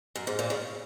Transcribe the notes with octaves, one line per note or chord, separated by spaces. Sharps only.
F#2
G#2
A#2
C#3